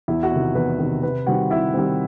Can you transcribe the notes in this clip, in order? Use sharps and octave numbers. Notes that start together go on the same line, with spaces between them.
E2 E4 E5
F#4 F#5
C3 D#3
E2 B4
C3 D#3
C3 B4
D#3 G3 C4 F#4 F#5
C3 E4 E5
D#3 G3 C4